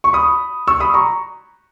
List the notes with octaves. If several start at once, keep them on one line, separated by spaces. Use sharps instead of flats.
C#6
B5 D#6
C#6 E6
B5 D#6
A#5 C#6